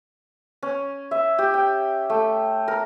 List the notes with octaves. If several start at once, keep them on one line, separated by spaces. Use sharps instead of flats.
C#4
E5
G4
G5
A3
A#4